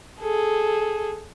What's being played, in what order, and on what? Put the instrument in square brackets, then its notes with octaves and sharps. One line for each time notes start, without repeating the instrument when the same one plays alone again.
[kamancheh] G#4 A4